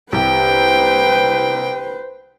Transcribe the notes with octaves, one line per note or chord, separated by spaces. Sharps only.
C2 G4 B4 C5 G5